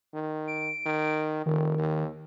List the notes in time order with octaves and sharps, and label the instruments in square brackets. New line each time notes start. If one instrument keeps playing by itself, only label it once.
[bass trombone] D#3
[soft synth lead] D7
[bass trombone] D#3
[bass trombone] F1 [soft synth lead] D#3
[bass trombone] D#2